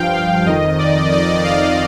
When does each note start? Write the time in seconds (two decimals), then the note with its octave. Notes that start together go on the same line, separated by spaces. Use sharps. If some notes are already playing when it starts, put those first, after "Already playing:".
Already playing: G2 F3 F5 G5
0.13 F5
0.46 F2 D#3 D#5
0.78 D5
1.12 D5
1.44 F5